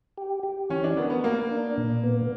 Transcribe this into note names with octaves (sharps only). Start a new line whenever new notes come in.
G4
G4
E3 C#4
D4
B3 A#4
B3
A#3 A#4
D4
A#2
B3